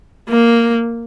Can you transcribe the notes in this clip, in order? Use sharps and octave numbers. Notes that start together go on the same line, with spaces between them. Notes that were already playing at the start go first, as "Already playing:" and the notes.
A#3